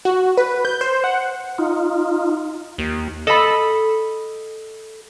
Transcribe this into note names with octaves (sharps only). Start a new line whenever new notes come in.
F#4
B4
G6
C5
F#5
D#4 F4
D#2
A4 D#5 B5